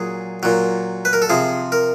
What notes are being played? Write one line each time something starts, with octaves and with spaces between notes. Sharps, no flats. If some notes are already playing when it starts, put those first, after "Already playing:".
Already playing: A#2 F#3 G#4
A#2 F#3
B4
A#4
A4
C3 F3 G#4
A#4